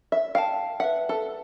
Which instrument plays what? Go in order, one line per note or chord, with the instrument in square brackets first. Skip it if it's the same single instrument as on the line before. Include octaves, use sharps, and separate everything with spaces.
[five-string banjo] E5
[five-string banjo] F5 [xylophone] G5 A5
[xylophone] B4 E5 [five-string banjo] F#5
[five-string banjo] A4